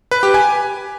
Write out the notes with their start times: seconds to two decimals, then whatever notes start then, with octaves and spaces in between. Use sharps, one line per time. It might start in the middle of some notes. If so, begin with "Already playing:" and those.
0.11 B4
0.23 G4
0.34 G#5